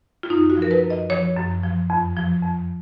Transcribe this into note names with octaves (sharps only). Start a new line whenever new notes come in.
F4
F#2 D#4
F#4
F3
A#4
B4
F#2
D#5
F3 C#5
F#2
F3
F2
F3
F2